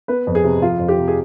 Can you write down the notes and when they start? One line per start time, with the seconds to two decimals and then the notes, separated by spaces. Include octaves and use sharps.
0.08 B3 B4
0.27 F2
0.35 G#4
0.44 C3
0.62 F2 F4
0.79 F2
0.88 G4
0.97 C3
1.08 G#4